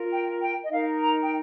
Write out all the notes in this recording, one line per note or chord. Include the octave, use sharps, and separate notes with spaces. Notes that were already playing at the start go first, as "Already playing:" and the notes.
Already playing: F4 A#4
G5
G5
D#5
D#4 A#4 F5
A#5
G5